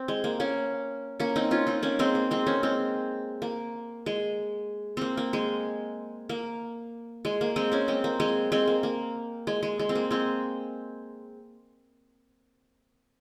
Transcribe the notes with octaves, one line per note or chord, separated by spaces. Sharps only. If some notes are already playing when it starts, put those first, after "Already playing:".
Already playing: C4
G#3
A#3
A#3 C#4
A#3 C#4
C4 D#4
C#4 F4
C4 D#4
A#3 C#4
G#3 C4
A#3
G#3 C4
A#3 C#4
G#3 C4
A#3
G#3
A#3 C4
A#3
G#3
A#3
G#3
A#3
G#3 C4
A#3 C#4
G#3 C4
A#3
G#3 C4
G#3 C4
A#3
A#3
G#3
G#3
G#3
C4
A#3
G#3 C4